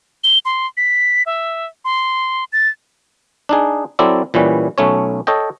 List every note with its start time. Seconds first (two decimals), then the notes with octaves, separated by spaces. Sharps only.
0.24 G7
0.45 C6
0.77 B6
1.26 E5
1.85 C6
2.53 A6
3.49 D4 D#4 G#4
3.99 F#3 C4 E4 A4 D5
4.34 A#2 E3 G3 C#4 B4
4.78 B1 A3 C#4 C#5
5.27 A4 C#5 D#5 G5